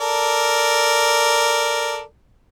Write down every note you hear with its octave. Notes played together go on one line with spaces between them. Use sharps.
A4 A#4 D5